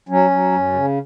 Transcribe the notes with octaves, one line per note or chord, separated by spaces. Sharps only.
F#3 C#4
F#3
F#2
C#3